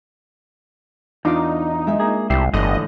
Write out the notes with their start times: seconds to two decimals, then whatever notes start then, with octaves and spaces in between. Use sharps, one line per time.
1.25 E2 D4 D#4 F4 D5
1.87 G#3 E5
2.00 A#3 G#4
2.30 C2 E4 G4 E5 C7
2.54 G1 A2 D3 E3 D#5 G6 D#7